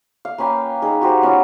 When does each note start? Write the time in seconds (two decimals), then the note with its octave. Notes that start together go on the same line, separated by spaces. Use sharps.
0.25 F5
0.38 A#3 C#4 B4 G5
0.82 D#4 G#4
1.02 F#4 G4 C5
1.22 B3 C#4 F4 F#4